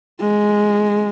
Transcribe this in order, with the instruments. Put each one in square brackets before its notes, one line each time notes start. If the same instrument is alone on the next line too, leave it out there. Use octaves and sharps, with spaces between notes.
[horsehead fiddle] G#3